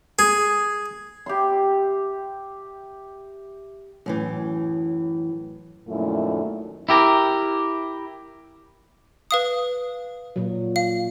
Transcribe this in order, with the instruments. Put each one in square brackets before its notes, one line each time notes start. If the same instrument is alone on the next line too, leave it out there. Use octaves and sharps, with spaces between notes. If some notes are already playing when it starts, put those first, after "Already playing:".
[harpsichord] G#4
[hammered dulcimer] G4 E5 C6
[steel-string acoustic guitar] F#2 A2 E3
[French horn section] F#2 A#2 D#3 F3 A3 E4
[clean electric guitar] E4 G4 A#4
[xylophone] B4 F5 D#6
[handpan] A#2 F#3
[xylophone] F5